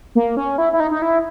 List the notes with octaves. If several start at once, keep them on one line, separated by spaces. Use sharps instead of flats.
A#3
C#4
E4
E4
D#4
D#4
E4